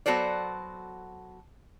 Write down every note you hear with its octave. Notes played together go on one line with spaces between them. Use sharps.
F#3 B3 F#4 A4 C5 D5